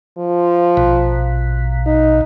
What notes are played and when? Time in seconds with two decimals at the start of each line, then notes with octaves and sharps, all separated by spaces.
0.18 F3
0.77 A#1 B2
1.87 D#4